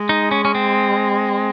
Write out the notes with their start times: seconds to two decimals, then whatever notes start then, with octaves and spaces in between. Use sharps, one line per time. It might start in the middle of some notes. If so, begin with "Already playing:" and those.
Already playing: G#3
0.09 D#4
0.31 C#4
0.45 C#4
0.55 C4